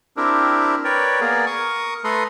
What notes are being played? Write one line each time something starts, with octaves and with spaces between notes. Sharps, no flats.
C4 D4 E4 G4 A#4
A#4 B4 C#5 D5 G5
A#3 B3 G#4 A#4 D5
A#4 C#6 D#6
A3 A4 B4 A#5 C6 D#6